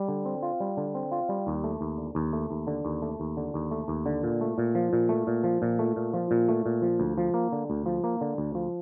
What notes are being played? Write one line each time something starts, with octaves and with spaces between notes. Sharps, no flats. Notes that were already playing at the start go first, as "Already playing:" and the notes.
Already playing: G3
D3
C4
F4
G3
D3
C4
F4
G3
D#2
A3
D#2
D3
D#2
A3
D#2
D3
D#2
A3
D#2
D3
D#2
A3
D#2
D3
A#2
A3
A#2
F3
A#2
A3
A#2
F3
A#2
A3
A#2
F3
A#2
A3
A#2
F3
D2
F3
A#3
D3
D2
F3
A#3
D3
D2
F3